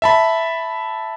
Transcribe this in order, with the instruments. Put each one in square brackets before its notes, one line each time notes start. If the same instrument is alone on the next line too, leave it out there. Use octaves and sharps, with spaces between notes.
[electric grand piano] E5 A5 B5